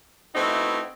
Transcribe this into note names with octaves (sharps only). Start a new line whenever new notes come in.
A3 B3 C4 D#4 E4 F#4